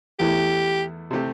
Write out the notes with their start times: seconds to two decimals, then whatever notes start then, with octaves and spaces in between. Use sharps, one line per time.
0.19 E2 E3 A3 E4 G4
1.11 C3 A3 C4 G4